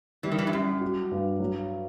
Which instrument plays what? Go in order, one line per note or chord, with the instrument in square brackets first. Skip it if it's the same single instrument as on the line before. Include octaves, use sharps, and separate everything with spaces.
[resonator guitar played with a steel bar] E3 [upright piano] G3
[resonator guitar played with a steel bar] D#3
E3
G2
[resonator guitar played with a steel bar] F#2 [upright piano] G3
[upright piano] F#4
G2
F#3